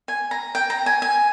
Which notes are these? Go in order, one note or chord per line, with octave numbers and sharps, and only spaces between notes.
G#5
A#5
G5
A#5
G#5
G#5